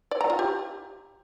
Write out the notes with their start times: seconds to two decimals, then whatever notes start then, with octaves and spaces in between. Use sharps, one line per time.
0.11 D5
0.21 A#5
0.30 F4
0.39 G4